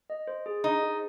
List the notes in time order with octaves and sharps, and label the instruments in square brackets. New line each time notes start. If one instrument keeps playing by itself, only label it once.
[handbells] D#5
C5
G#4
[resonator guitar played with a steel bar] D#4 [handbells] C5
[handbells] G#4